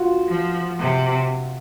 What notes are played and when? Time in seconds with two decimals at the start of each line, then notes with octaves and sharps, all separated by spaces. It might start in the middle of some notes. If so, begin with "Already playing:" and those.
Already playing: F4 F#4
0.28 F3
0.79 C3